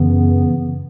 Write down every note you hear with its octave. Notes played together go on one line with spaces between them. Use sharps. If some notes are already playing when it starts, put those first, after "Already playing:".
Already playing: F#2 C#3 E3 B3